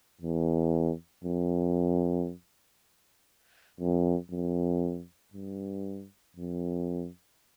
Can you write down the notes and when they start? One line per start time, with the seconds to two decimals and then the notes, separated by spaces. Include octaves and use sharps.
0.21 E2
1.24 F2
3.81 F2
4.31 F2
5.34 G2
6.36 F2